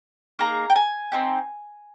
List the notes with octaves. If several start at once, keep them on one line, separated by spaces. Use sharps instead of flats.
A#3 D#4 G#4 A#5
G5
G#5
C4 D#4 G4